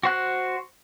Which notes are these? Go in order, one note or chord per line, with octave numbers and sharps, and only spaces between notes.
F#4 C5 F#6